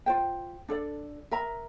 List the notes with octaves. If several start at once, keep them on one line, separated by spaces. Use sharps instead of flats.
F4 C5 G5
D4 A4 D5
A#4 E5 A#5